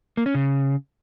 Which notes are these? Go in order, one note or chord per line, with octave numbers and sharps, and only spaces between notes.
A#3
C#4
C#3